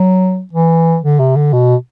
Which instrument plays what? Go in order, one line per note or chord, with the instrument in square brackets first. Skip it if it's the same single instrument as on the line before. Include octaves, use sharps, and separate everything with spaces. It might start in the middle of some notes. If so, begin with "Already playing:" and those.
Already playing: [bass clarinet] F#3
E3
D3
C3
D3
B2